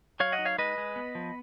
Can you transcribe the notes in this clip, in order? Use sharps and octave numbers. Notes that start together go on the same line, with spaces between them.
F#3 C#5 F5
D#5 F#5
D#4
C#5 F5
G#3 B4 D#5
G#3
B3
F3